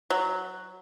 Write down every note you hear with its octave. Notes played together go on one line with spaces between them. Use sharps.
F#3